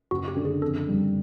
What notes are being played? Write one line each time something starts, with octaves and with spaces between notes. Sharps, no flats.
F#1 F#4
G4
D3
G#4
F2 A4
G3